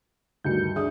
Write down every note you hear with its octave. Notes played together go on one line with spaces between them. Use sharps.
D2 G2 D#3 G6 C#7
D4 G#4 E5 D#6 G6